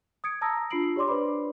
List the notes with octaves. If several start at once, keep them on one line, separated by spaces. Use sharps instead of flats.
D#6 G#6 C#7 D7
A5 A#5 D#6 E6 A#6
D4 F4 B5 C7 D7 F#7
G4 C#5 D5 C6 D6
D4 B4 C5 D5 B5